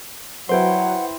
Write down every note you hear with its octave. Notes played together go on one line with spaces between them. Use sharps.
F#3 E4 B4 C5 F#5 G5 C6